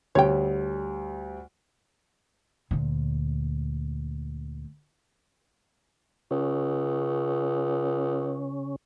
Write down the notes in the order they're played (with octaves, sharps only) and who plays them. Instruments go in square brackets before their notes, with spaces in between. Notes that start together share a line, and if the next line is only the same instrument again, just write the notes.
[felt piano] D2 G3 [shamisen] C#5 G5
[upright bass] D2 A#2
[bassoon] C#2 [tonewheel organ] C#3 C#4